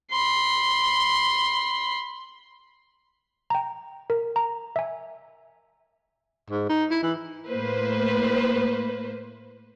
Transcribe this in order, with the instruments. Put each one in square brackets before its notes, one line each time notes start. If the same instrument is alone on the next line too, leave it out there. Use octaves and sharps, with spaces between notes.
[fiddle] B5 C6
[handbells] G5 A#5
A#4
A#5
E5 G#5
[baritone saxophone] G#2
D#4
E4
E3
[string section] A2 A#3 B4 C5